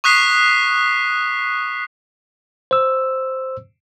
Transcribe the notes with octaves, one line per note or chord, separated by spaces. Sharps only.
C#6 D#6 F#6 B6 C7
C5 E6